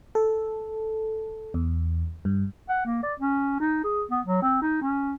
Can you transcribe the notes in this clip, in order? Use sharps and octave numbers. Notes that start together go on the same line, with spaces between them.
A4
E2
G2
F#5
A#3
D5
C#4
D#4
G#4
B3
F#3
C4
D#4
C#4